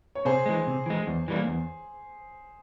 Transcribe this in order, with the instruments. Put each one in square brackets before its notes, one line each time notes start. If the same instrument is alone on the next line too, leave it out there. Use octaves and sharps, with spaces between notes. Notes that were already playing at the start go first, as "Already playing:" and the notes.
[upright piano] C#5
[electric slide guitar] C3 [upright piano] G#4 C5
[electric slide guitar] E3 G#3
C3
E3 G#3
E2
E3 G3 A#3
E2